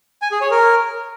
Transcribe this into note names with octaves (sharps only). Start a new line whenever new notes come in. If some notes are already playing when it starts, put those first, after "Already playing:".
G#5
G#4
C#5
A#4